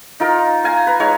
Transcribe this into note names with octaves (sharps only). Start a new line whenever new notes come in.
D#4 F4 A#4
F5 G#5 A#5
B4 A#5
G#3 D#4 C#5 G#5